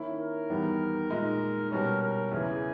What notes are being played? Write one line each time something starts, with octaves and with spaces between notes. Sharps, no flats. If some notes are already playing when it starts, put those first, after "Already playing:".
Already playing: D#3 A#3 C#4 E4
A#4
E2 D#3 G3 B3
A#2 G#3 D#4
B2 G3 C#4 A#4
A#4
E2 C#3 E3 G#4